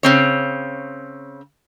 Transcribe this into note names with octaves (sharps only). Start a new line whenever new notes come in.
C#3 C4 C#5